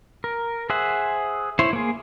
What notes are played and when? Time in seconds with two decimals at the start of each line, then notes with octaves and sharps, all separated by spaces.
0.24 A#4
0.70 G#4 C5 E5 F#5
1.59 E4 C5 C#5
1.73 A#3 G#4